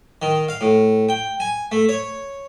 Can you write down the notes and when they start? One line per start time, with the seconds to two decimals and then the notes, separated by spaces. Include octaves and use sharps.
0.22 D#3
0.48 F5
0.61 A2
1.09 G5
1.40 G#5
1.72 A3
1.89 C#5